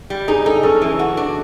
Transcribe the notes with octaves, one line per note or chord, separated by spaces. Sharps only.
G3
D#4 G#4
D#4 A4
C#4 A4
E3
F#4
D4